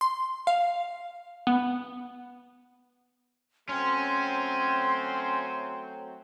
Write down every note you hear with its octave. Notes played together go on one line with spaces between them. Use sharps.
C6
F5
B3
F#3 A3 C4 C#4 C6